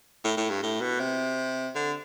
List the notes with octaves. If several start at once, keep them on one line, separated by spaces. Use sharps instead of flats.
A2
A2
G2
A2
B2
C3
D3